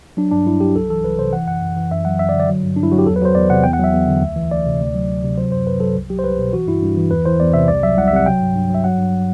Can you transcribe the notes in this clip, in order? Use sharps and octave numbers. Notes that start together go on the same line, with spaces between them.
F#3 D4
G2 D4
G2 E4
F#3 G4
C2 A4
E3 A4
C2 B4
C3 C5
E3 F#5
F#2 F#5
F#2
E3
F#2 E5
F#3 F#5
F#2 E5
D5
D3
D5
F#3
G2
G2 D4
E4
F#3 F#4
G4
E2 A4
B4
F#3 C5
E2 D5
C3 F#5
E2 G5
F#5
F#3 E5
E2
D3
D2
E3
D2 D5
C3
D2
F#3
D2
C3
F#3 C5
F#2 C5
F#2 B4
F#3 A4
C2
F#3 G4
C5
C2 B4
B2
E3 F#4
G2 E4
G2
E3
E2 B4
E3 C5
E2 D5
C3 E5
C2 D5
F#3 E5
C2 F#5
E5
C3 F#5
F#3 G5
G2
G2
F#3 E5
F#3 F#5
G2